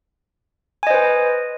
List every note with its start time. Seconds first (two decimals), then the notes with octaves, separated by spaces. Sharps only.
0.83 G#5
0.87 D#5
0.90 C5
0.94 B4